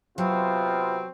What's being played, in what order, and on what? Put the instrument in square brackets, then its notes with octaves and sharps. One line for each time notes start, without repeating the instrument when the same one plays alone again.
[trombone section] C3 B3 F4 [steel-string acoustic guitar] F#3 [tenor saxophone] C4